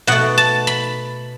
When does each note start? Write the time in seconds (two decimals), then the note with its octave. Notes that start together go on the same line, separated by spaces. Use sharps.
0.07 B2 A3 F#5
0.38 A5
0.67 B5